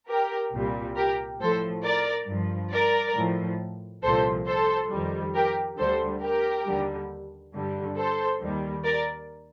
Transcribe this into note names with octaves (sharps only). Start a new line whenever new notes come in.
G4 A#4
C2 A#2 G3
G4 A#4
A2 F3 A4 C5
A#4 D5
G2 F3
A#4 D5
A2 F3
C2 A#2 F3 A4 C5
A4 C5
F2 D#3 G3
G4 A#4
D2 D3 G3 A4 C5
G4 A#4
D#2 D3 G3
G2 D3 G3
A4 C5
D#2 D#3 G3
A#4 D5